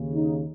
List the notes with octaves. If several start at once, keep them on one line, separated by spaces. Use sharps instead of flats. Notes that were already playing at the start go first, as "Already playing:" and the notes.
Already playing: D#2 C#3
D#4